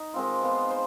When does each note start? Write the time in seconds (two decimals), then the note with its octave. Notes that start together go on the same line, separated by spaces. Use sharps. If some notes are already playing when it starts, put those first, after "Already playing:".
Already playing: D#4
0.14 D#3 G#3 C4 F4
0.42 B3 F4 C5
0.71 C5